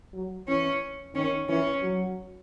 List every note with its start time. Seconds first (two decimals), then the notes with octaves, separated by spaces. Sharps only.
0.14 F#3
0.48 E3 C#4
1.15 D#3 C#4
1.49 E3 C#4
1.82 F#3